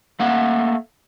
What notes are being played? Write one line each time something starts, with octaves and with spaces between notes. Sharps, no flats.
A3 A#3 F#5